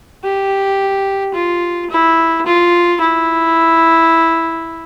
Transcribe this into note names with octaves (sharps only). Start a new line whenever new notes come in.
G4
F4
E4
F4
E4